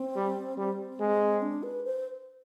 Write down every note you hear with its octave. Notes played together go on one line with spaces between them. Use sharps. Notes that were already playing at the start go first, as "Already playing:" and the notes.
Already playing: C4
G3
G3 C4
G#3
D4
B4
C5